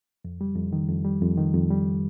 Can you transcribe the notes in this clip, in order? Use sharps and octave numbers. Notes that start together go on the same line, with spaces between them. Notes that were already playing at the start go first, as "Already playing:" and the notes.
F2
G3
F2
D#3
F2
G3
F2
D#3
F2
G3